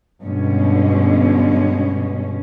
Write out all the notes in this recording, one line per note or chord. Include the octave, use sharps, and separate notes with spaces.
G2 B2 D3 G#3 C#4